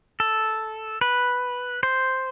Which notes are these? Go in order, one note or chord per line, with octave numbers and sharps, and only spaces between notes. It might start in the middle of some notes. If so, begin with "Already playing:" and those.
A4
B4
C5